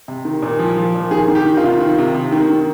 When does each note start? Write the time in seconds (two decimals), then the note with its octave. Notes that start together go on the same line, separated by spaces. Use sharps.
0.08 C3
0.25 D#3
0.42 A#2
0.59 F3
0.77 F3
0.95 A#2
1.11 D#3 G#4
1.28 D#3
1.35 G4
1.46 D#3
1.57 F4
1.64 C3
1.81 D#3
1.98 C3
2.14 C3
2.32 D#3
2.50 D#3